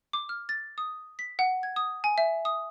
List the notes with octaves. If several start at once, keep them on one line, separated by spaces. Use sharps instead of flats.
D6
F6
A6
D#6
B6
F#5
G#6
D#6
G#5
E5
D#6